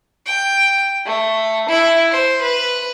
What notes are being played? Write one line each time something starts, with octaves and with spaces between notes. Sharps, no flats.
G5
A3
E4
C5
B4